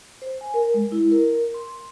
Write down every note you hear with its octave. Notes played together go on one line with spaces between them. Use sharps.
C5
G#5
A#4
G#3
E4
A#4
C6